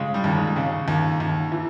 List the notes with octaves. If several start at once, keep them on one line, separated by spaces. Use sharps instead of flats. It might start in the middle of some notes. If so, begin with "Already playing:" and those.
Already playing: C#3 G#3
G3
D#2
G#3
C#3
D#2
D#2
E3